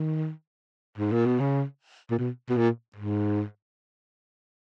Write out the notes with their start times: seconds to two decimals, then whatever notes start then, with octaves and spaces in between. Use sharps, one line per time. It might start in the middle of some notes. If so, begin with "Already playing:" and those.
Already playing: D#3
0.98 G#2
1.12 A#2
1.26 B2
1.40 C#3
2.11 A#2
2.18 B2
2.49 B2
2.57 A#2
2.96 G#2